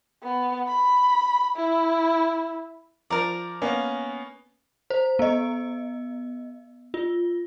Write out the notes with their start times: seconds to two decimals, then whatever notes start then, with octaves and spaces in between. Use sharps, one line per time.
0.23 B3
0.67 B5
1.56 E4
3.10 F3 A#4 D5 A#5
3.62 A#3 B3 C#4
4.90 C5
5.19 B3 D#5
6.94 F4